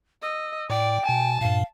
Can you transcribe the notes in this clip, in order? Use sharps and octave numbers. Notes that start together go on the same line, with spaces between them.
D#5 E6
A2 D5 G5
B2 G#5 A5
G2 A#2 F5